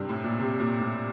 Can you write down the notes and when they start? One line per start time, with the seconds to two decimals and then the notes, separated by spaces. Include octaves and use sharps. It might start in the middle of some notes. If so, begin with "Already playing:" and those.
Already playing: G2 C3
0.09 A2
0.24 A#2
0.39 C3
0.60 A#2
0.80 A2